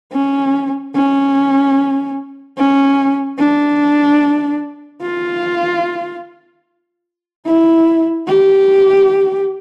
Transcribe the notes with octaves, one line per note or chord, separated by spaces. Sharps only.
C#4
C#4
C#4
D4
F4
E4
G4